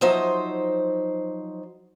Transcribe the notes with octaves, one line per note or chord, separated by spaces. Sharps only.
F3 F#3 D#4 C5 E5